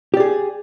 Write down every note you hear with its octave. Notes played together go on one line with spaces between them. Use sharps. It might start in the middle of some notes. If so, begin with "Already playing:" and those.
G4 G#4 D5